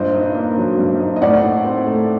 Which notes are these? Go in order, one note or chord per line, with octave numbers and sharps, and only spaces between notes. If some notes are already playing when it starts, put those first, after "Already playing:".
Already playing: G2 A#2 C5 D#5
D#4
A#3
F#3
G2
D#4
D#5
A2 D5 F#5
D#4
C4
A3